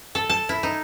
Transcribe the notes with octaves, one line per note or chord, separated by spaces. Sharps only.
A4
A5
E4
D#4